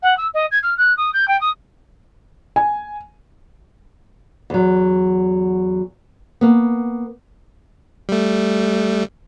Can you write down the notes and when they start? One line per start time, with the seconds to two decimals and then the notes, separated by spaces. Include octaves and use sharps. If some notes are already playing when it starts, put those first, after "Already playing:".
0.02 F#5
0.17 E6
0.34 D#5
0.51 G#6
0.63 F6
0.78 F#6
0.97 D#6
1.13 G6
1.28 G5
1.41 D#6
2.56 G#5
4.50 E2 F#3
6.41 A#3 B3
8.09 G3 A3